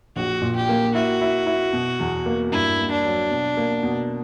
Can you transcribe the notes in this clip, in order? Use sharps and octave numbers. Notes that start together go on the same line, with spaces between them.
A#1 F#4
A#2
G4
A#3
E4 F#4
E4
E4
B2
E2
A#3
G2 E4
A#3
D4
F#3
B2
A#3
B2